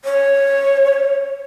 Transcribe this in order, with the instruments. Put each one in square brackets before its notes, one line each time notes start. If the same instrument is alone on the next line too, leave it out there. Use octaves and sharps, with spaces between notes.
[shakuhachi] C#5